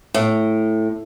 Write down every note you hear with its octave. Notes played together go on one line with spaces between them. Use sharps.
A2